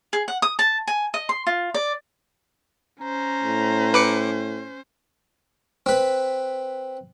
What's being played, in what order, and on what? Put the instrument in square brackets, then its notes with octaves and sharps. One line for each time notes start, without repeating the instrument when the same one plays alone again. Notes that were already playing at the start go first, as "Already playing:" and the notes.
[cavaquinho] G#4
F#5
D#6
A5
G#5
D#5
C6
F4
D5
[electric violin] C#4 C5 [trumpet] A#5
[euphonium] A2
[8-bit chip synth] B4 D6 C#7
[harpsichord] C4 B4